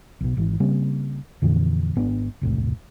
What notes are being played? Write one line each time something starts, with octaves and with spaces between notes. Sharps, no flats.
B1 B2
G#1 E3
C#3 G3 A#3 C4
F2 A#2 D3 E3
G#1 B3 C#4 D4
E1 C2 A2